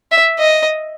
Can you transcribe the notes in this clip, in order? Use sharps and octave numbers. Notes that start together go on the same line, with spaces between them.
E5
D#5